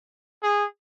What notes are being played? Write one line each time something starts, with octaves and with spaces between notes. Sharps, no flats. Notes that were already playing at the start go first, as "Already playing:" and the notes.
G#4